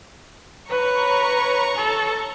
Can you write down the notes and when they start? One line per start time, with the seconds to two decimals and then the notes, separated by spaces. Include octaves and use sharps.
0.70 B4 C#5 A#5 C#6
1.76 A4